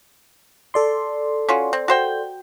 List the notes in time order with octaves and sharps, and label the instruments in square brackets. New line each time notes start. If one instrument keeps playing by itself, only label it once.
[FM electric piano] A4 D5 C6
[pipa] C#4 F4 F#4
C4
F#4 C5 G5